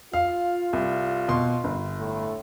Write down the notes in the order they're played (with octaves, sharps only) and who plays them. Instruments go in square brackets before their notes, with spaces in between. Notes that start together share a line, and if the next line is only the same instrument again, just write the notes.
[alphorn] F4 [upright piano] F5
[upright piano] C2
B2 C6
G1
[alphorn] A2